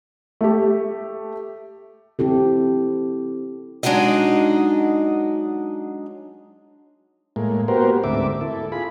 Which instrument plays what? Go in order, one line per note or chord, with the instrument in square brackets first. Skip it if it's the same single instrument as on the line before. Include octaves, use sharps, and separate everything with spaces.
[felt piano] A3 G4
[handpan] C4 E4 G4 A4
[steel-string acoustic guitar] F#3 G#3 D4 D#4 F#4 D#5
[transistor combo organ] A2 G#3 A#3
A#3 B3 F#4 G4 A#4 C5
D2 G#2 A3 C4 E5 D6
E4 A4
F4 G#4 B5